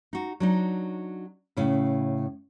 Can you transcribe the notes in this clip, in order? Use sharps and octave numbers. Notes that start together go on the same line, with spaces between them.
D#4 F#4
F#3 D4 D#4
A2 C#3 E4